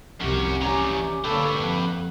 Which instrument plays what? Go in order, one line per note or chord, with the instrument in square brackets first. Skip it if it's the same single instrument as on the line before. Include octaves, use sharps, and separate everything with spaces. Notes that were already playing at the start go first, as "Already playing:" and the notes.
[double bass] F1 C2 [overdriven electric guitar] F#2 C#4 [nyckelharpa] G4
[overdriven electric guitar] E3 A#5 [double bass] C#4 [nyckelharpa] G4 D5
[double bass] D3 A#3 [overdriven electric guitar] G4 B4 [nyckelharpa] A4 C#5
[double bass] F2 [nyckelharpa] F#5